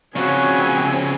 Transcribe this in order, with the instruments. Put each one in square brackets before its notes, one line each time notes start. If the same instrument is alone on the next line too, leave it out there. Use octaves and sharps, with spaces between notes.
[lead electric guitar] C#3 F3 [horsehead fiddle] C4 G#5 [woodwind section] F#4 B4 C#5